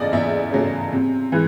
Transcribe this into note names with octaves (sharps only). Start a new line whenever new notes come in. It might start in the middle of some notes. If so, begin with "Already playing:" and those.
Already playing: E2 C#3 A3 D5 D#5
E2 E5
C#3 F#3 A3
C3
E3 G#3